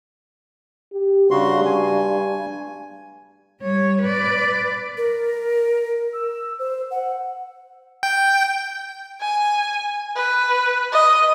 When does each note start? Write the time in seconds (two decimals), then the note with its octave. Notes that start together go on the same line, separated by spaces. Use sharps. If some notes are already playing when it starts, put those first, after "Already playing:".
0.93 G4
1.31 G2 C#3 F#4 C6
1.65 G#5
3.61 G3 C#5
4.02 B4 D5
4.97 A#4
6.13 E6
6.59 C5
6.91 F#5
8.03 G5
9.21 G#5
10.16 B4
10.92 D#5